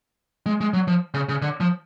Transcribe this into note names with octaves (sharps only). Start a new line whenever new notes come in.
G#3
G#3
F#3
F3
C#3
C#3
D3
F3